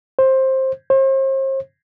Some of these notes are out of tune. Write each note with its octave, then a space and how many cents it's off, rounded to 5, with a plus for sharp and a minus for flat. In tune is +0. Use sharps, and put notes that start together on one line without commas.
C5 +15
C5 +40